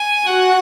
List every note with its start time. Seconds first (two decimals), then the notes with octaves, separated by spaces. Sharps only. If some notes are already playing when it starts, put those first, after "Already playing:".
Already playing: G#5
0.26 F#4 F#5